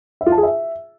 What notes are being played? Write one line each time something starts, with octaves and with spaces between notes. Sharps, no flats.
E5
F4
A5
G#4
E5